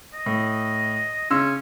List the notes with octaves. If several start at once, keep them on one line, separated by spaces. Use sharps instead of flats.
D#5
A2
C#3 C#4 C6 E6